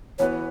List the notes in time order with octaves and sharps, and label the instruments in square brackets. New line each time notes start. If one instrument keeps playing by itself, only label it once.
[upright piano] E3 B3 F#4 B4 [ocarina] C#5